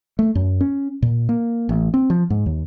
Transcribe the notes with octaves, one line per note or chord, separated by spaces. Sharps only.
A3
F#2
C#4
A#2
A#3
A1
C4
F3
G#2
D#2